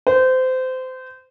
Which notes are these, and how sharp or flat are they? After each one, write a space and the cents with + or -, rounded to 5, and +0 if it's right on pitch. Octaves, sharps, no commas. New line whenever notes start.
C5 -25